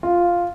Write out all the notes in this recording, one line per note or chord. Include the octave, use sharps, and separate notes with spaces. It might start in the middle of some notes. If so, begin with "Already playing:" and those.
F4